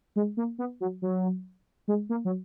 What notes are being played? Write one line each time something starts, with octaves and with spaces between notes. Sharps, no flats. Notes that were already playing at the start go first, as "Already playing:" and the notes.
G#3
A#3
B3
F#3
F#3
G#3
A#3
F#3